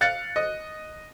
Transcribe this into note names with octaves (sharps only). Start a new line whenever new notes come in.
F5 F#6 A6 C#7
D#5